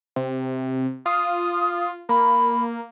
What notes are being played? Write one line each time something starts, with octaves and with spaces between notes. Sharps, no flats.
C3
F4 D#6
A#3 B5